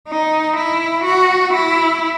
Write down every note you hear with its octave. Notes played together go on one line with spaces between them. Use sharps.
D#4
E4
F#4
E4